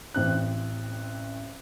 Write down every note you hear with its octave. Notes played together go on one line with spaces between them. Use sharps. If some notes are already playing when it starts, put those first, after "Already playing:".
A1 C4 F#6